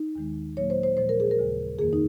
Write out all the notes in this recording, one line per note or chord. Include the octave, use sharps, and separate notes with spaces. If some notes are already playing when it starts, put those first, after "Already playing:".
Already playing: D#4
D#2 D#3 G#3
A#2 F#3 A#3 C#5
C5
C5
A#2 F3 G#3 C5
A#4
G#4
A#4
D#2 C#3 G#3
F2 D#3 A#3 G#4
D#4